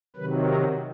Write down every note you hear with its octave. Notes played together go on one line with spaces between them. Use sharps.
C3 D#3 F#3 B4
A#4